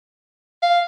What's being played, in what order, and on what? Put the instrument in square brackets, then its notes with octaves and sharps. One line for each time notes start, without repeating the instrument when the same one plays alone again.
[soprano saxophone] F5